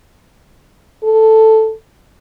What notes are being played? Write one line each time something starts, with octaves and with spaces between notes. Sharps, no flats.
A4